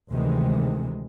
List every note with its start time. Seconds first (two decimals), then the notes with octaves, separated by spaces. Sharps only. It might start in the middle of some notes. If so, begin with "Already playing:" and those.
0.12 D2 C3 D#3 E3 G#3